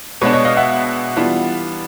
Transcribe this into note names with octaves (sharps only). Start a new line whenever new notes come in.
B2 G#3 B3 D4 B4 C#5
C#5 D#5
D#5 F5
E5 F#5
E3 G3 B3 D4 F4